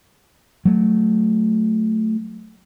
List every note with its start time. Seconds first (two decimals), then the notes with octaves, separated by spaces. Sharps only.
0.65 F#3 A3